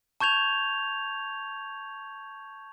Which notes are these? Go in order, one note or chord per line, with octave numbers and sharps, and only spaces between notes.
A5 C#6 G6 G#6 F7